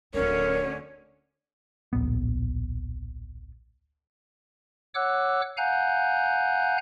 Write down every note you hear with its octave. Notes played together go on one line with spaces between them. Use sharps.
D1 D2 D3 C4 C#4 A#4 C#5
D1 A#1 B3
C#5 F#5 D6 E6 F#6
F5 F#5 G#5 A#5 F#6 G6